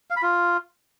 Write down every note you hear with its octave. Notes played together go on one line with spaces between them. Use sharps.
F5
B5
F4